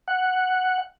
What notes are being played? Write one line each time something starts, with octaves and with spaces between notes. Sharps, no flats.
F#5